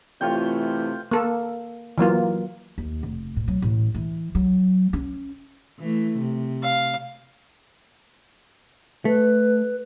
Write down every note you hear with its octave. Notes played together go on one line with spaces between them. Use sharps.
C3 E3 A3 F4 C#5 G5
A#3 A4
E3 F#3 A#3 F4
D#2
F1
A2
F#3
A1
E3
F#3
C#4
E3 A3
C3
F5
A3 B4